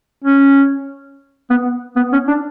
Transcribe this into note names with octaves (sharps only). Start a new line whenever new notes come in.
C#4
B3
B3
C#4
D4